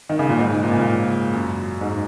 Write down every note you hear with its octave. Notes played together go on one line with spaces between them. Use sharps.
D#3
C#3
A#2
G#2
A#2
C#3
A#2
F#2
G#2